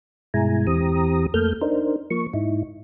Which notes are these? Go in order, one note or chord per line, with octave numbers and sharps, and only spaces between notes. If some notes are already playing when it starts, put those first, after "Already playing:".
G2 B2 G#3 E4 G#5 A#5
E2 E3 C4 G4 A#5 D#6
F2 A3 A#3 A4 F6 G6
D4 D#4 A#4 C5
F3 A#3 C#6
G#2 D#4 E4